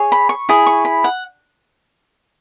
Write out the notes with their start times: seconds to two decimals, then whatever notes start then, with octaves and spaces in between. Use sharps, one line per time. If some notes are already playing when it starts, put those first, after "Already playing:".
Already playing: G#4 C#5
0.12 B5
0.29 C#6
0.49 E4 G#4
0.66 C#6
0.85 B5
1.04 F#5